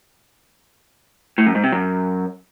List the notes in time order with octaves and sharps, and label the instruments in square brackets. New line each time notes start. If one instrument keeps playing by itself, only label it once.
[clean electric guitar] A2
F#2
G#2
C3
F#2